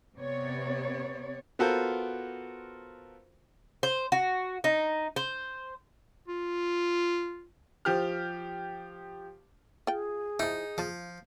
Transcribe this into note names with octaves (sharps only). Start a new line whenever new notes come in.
C3 B3 C#5 D5
B3 F4 F#4 A4 A#4 C5
C5
F#4
D#4
C5
F4
F3 G4 F6
F4 G#4 G5
F3 D#4 E4
F3 F4 A5